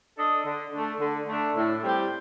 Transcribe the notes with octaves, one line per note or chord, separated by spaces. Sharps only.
D4 A4 D#5
D3
A3 D4
D3
A3 D4
A2
G3 C4 G4